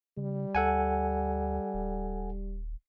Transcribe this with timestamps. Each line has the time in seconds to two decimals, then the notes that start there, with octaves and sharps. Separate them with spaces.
0.17 C#3 G3
0.55 D2 A4 F#5 G#5
1.74 D#1